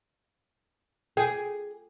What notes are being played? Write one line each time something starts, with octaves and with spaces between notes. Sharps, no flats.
G#4 G5